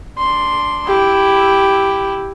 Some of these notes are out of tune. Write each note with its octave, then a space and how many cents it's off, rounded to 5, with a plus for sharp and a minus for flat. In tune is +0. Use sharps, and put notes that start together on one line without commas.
D4 +0 C6 +0
E4 +0 G4 +0